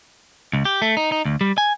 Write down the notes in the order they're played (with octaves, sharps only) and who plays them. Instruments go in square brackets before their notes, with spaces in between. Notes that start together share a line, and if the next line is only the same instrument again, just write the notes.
[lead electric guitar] C#2
G4
A3
D#4
D#4
D2
G3
G#5